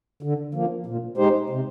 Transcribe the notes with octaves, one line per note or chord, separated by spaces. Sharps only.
D3
F3 A#3
A#2
G#3 D#4 G4 C5
C3